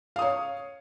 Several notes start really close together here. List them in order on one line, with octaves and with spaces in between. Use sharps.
F5 D#6 C#5